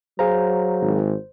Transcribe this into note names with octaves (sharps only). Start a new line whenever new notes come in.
F#3 G#4 C5 F5 A#5
G#1